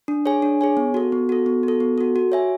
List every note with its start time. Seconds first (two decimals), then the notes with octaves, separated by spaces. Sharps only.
0.08 D4
0.26 G#4 C#5 G#5
0.42 D4
0.61 G#4 C#5 G#5
0.77 B3
0.94 F#4 A4
1.12 B3
1.29 F#4 A4
1.46 B3
1.63 F#4
1.68 A4
1.80 B3
1.98 F#4 A4
2.16 F#4
2.32 C#5 E5 G#5